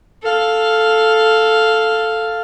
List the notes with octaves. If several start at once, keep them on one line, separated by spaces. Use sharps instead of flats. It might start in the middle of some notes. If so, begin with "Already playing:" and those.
A4 F5